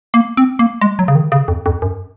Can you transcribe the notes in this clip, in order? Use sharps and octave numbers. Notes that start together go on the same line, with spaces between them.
A#3
C4
A#3
G#3
F#3
C#3
D#3
C#3
F2
F2
F#2